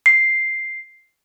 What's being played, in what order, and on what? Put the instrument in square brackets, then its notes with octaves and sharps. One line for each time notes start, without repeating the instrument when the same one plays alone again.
[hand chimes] C7